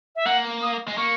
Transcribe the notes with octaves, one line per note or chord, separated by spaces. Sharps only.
E5
A#3 F#5
D#6
G#3
A#3 C#6